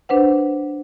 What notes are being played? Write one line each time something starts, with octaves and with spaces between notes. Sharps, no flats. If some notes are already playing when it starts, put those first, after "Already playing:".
D4 B4 C5 F#5